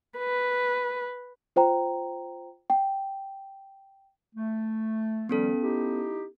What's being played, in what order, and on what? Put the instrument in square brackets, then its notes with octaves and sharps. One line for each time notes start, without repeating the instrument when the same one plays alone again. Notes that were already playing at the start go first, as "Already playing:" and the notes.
[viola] B4
[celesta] F4 C5 G5 A#5
G5
[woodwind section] A3
[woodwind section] D#3 F3 G3 [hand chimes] B3 C#4 A4
[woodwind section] D#4 E4 G4